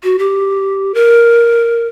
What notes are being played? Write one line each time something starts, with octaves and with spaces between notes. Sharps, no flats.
F#4
G4
A#4